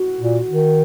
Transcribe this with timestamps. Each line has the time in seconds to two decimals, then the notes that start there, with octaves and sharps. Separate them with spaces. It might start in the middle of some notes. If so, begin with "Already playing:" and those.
Already playing: F#4
0.20 A#2
0.47 D#3